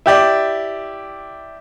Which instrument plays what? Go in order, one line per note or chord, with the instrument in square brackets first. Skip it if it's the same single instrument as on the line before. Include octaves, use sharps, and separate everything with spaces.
[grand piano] E4 G4 D5